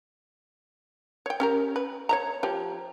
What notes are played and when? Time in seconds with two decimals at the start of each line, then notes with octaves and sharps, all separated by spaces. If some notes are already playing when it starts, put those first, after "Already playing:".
1.26 C#5 G5
1.40 C#4 G4 A#4
1.76 B4
2.09 C#5 E5 A#5
2.43 F3 G4